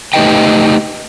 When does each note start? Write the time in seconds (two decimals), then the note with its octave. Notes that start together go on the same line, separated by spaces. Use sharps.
0.14 A3 D#4 G4 B4 D#5 G5